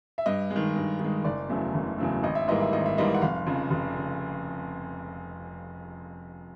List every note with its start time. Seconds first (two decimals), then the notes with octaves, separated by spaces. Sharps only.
0.18 E5
0.26 G2 D#5
0.50 G#3
0.56 D#3
0.76 G2
1.00 D#3 G#3
1.24 F#1 D5
1.49 E2 C#3 F#3 A3
1.74 F#1
1.98 E2 C#3 F#3 A3
2.23 G#1 D#5
2.35 E5
2.48 G#2 E3 G3 A#3 D#5
2.61 E5
2.72 G#1 D#5
2.86 E5
2.97 G#2 E3 G3 A#3 D#5
3.14 F#5
3.22 F1 F5
3.47 F2 C#3
3.70 F1
3.97 C#3